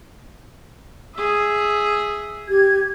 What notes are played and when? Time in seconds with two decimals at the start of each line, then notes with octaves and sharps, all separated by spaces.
1.15 G#4 E5
2.48 G4 G#6